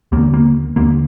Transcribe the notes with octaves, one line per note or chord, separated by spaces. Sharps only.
D#2 D3 A#3
A#3
D#2 D3 A#3